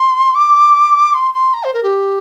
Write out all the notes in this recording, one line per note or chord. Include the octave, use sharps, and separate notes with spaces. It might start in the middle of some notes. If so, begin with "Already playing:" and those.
Already playing: C6
D6
C6
C6
A#5
C5
A#4
G4